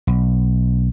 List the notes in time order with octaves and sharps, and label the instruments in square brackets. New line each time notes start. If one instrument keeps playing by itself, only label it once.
[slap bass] B1